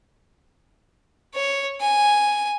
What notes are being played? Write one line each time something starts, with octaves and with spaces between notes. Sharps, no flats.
C#5
G#5